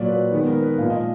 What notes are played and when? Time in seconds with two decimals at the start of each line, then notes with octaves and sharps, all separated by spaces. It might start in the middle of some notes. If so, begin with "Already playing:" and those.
Already playing: A#2 F#3 A#3 D5
0.08 B4
0.31 D#3 G#3 B3
0.47 A#4
0.62 B4
0.78 A#2 F3 G#3 F5
0.90 D#5